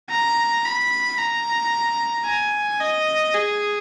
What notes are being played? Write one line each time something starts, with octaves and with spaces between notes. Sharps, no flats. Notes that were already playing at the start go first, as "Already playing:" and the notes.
A#5
B5
A#5
G#5
D#5
G#4